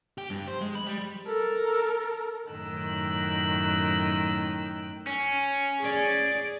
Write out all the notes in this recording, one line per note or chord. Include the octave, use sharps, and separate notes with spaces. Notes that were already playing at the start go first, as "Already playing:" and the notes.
G4
G2
C5
G#3
B5
G3
A4 A#4
F#2 A2 D#3 G5 E6 F#6
C#4
G#4 D5